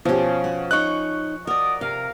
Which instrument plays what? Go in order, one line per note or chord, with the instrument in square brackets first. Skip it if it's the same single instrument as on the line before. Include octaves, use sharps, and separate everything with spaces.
[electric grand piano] B2 [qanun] F3 C#4 [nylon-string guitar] E4 G4
[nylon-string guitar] F#4
[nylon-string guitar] D#4 C#5 D#5 [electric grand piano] C#6 F#6
[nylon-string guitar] F#4 [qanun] A#4 D5 [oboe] D#5
[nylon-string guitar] C3 [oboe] A#4 [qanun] F5